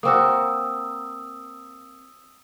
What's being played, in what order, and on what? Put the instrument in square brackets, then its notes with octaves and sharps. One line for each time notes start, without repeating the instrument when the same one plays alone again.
[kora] A#3 C4 F#4 [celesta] D#6 E6